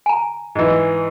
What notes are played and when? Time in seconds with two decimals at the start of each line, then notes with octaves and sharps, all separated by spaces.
0.06 G#5 A#5
0.55 G#2 E3